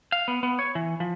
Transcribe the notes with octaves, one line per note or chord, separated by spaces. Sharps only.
F5
B3
B3
C#5
E3
F3